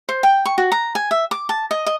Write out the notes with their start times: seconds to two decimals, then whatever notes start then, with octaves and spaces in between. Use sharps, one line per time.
0.09 C5
0.23 G5
0.45 C#6
0.58 F#4
0.72 A#5
0.95 G#5
1.11 E5
1.31 D6
1.49 A5
1.71 D#5
1.86 D#5